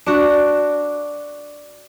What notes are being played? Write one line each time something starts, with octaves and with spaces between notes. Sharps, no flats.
D4 F#4